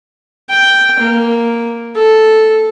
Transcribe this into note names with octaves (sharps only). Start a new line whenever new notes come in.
G5
A#3
A4